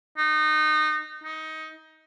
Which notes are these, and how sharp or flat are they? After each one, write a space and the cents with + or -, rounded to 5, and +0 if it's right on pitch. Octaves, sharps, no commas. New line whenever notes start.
D#4 -25
D#4 +20